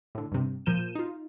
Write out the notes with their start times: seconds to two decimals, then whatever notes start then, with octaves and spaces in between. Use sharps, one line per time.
0.15 A2 D3
0.32 G2 C3
0.66 A#2 F3 A#4 G6 D#7 E7
0.95 D#4 F4